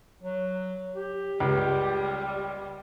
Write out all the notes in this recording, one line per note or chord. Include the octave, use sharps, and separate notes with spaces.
F#3
G4
C#2 G3